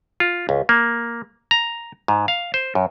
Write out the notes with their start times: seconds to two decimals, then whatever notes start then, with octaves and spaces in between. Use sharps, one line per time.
0.20 F4
0.49 C#2
0.69 A#3
1.51 A#5
2.08 G#2
2.28 F5
2.54 C5
2.75 F#2